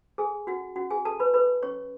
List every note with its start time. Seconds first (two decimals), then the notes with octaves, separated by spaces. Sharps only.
0.18 G#4 A4 G#5
0.47 C#4 F#4 F#5
0.76 C#4 F#4 F#5
0.90 G#4 G#5
1.05 F#4 A4 A5
1.20 B4 B5
1.34 A4 B4 B5
1.62 C#4 C#5 C#6